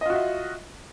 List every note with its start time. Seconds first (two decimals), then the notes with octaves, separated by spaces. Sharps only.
0.01 D#5
0.06 F4
0.10 F#4
0.14 E5